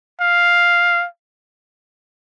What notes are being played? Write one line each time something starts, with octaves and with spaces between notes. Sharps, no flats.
F5